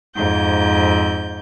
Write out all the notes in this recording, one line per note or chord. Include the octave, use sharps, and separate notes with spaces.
F2 G#2 G6